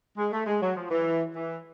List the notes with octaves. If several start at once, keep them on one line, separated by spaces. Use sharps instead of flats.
G#3
A3
G#3
F#3
F3
E3
E3